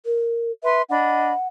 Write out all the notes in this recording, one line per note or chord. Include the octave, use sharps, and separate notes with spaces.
A#4
B4 E5 C6
D4 D#5 F#5 B5